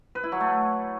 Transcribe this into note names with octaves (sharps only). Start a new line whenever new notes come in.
B4
E4
F#3
A3